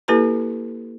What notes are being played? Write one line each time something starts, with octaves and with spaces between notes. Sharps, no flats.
A#3 E4 G4 A4 B4 A#5